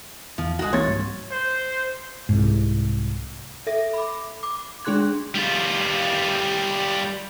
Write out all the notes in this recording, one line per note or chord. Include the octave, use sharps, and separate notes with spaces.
E2 E3 F3
C2 G#3 F#4
E3 A#3 C4 C#5 C6 A6
G#2 G3
C5
C2 G#2
A4 E5 A#6
B5 D6
D6
G#3 D4 G#4 C6 F#6 G#6
G3 F4